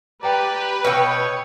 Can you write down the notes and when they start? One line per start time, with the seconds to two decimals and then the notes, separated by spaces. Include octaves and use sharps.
0.23 G4 B4 D5 G5 A#5
0.53 G4
0.85 B2 C#5 G5 C#6 E6 F6